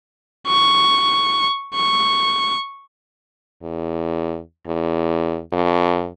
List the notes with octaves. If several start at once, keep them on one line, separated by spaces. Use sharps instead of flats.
C#6
C#6
E2
E2
F2